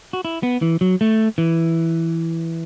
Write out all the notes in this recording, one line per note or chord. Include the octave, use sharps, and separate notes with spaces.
F#4
E4
B3
E3
F#3
A3
E3